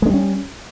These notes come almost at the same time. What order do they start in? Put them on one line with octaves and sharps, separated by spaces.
G#3 D4 G3 C#4